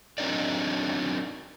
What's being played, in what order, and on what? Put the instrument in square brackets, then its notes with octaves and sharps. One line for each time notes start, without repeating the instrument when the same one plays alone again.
[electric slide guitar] F#3 C4 D4 D#4 A#4 D5